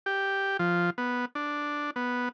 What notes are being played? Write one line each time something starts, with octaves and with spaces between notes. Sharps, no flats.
G4
F3
B3
D4
B3